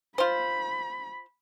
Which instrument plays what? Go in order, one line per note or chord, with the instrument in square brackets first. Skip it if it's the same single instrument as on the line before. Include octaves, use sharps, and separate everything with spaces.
[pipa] F4 C5 [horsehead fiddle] B5